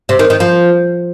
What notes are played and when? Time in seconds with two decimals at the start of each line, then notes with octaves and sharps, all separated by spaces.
0.09 C3
0.19 D#3
0.30 D#3
0.40 F3